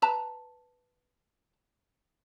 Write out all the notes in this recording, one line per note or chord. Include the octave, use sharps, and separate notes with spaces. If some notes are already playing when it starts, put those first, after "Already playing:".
B4 A5 A#5